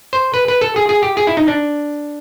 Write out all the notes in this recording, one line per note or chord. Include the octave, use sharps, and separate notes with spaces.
C5
B4
B4
A4
G#4
G#4
G4
G#4
E4
D#4
D4